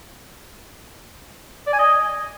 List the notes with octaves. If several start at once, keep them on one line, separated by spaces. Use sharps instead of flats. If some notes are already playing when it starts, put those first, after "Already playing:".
D5
G#5
D#5